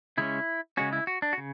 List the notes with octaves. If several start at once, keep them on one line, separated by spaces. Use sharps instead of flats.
C#3 G#3 C#4 E4
C#3 G#3 C#4 F#4
E4
F#4
D4
F#4
C#3